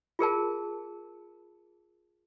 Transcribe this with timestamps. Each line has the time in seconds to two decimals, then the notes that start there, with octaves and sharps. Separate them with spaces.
0.19 F4 G#4 A#4 A5